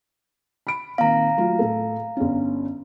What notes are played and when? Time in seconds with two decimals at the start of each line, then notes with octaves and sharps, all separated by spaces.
0.67 B5 D7
0.98 A#2 D#3 C4 F5 A#5
1.38 F#3 A3 F4
1.59 A2 A4
2.17 G1 C#4